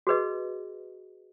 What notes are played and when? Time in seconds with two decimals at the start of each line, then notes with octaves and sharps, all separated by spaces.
0.07 F#4 G#4 B4 D#5